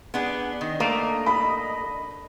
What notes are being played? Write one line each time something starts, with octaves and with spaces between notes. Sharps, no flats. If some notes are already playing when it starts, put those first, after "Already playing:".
B3 D4 G#4
D#3 D4 D#5
A3 A#3
B5